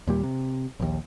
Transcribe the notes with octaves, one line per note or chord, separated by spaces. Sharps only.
D#2 A#2 G3
C3
A#1 D#2